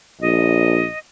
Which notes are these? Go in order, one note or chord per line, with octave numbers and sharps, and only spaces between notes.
A#1 D#5